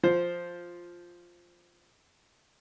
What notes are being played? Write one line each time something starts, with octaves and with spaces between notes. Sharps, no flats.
F3 C5